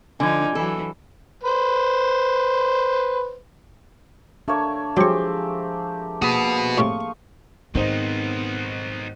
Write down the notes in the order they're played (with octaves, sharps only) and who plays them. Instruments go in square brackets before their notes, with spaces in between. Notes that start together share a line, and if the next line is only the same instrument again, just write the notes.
[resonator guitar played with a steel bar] D3 [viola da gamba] F3 D#4 [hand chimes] G#5 D6 G#6
[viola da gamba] E3 F#3 [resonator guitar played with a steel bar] A4
[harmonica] B4 C5
[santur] A3 A#3 C#5 [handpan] D4
[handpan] F3 G#4 [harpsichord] F#3 C#6 [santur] C4 G4
[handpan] A#3 G#4 [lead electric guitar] F#4 B4 [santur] D#6
[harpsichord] A2 C3 [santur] F5 C6 C#6
[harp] G#2 C7 [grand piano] D#3 C5 D#5 [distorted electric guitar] B3 D#4 [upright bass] C4